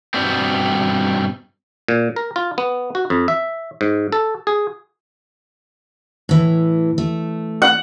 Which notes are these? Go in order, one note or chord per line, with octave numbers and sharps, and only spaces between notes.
G2 B2 G3 B3 C4
A#2
A#4
F4
B3
F#4
F2
E5
G#2
A4
G#4
A2 E3
A3
F#5